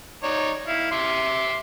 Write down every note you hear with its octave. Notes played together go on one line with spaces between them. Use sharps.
D#4 C#5 D5
E4 F5
E5 C6 D6